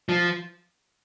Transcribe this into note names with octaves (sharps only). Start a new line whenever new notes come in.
F3